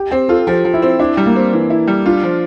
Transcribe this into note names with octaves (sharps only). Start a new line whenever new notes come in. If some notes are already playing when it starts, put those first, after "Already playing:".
Already playing: G4
C4 G4
F4 A4
F3 G4
F3
E4
C4
D4 E4
G3
A#3
C4
E3
E4
G3
D4 F4
F3